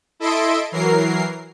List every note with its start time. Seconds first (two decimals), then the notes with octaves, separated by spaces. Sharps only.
0.20 E4 A4 D#5 E5 C6 D7
0.72 E3 F#3 A#4 C7